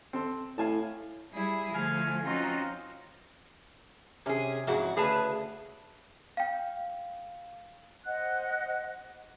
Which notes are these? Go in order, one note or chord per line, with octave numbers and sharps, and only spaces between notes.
C4 A4 C6
A2 F5 G#5 A5
G3 E4 G#4
D3 F3 A3 F5 G#5
C4 C#4 D#4 F4 F#4
C3 C#4 G#4
F2 G#2 C#3 E3 F#4
D2 C#3 G#4 B4 A5
F5 G5
C5 D#5 F#5 F#6